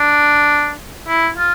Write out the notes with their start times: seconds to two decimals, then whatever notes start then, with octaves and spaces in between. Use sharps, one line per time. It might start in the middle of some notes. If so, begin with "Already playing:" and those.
Already playing: D4
1.08 E4
1.37 F4